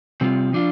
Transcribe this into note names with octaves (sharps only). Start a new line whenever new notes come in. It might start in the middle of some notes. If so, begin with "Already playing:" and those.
C3 G3 C4 F4
F3 D4 F4